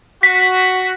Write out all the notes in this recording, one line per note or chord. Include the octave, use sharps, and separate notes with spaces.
F#4 B6